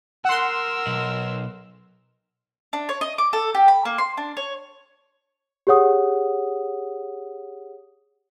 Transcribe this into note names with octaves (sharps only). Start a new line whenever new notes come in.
A#4 F#5 C6 E6
B1
D4
C#5
D#5
D6
A4
G4
B5
A#3
C6
D4
C#5
G4 G#4 C#5 F#5 D#6